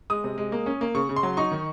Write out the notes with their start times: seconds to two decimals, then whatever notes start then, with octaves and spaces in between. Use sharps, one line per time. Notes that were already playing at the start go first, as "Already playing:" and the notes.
0.10 G#3 D#6
0.24 C3
0.38 G#3
0.52 A#3
0.66 C#4
0.81 A#3
0.94 C#3 C#6
1.09 C#3
1.16 C6
1.23 F#3
1.37 D#4 C#6
1.51 D#3